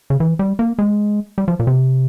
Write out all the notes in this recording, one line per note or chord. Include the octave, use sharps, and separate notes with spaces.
C#3
E3
G3
A#3
G#3
G3
F3
A#2
C3